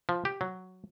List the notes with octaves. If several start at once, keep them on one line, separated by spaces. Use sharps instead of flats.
F3
G4
F#3